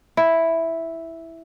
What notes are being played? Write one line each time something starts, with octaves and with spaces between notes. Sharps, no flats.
E4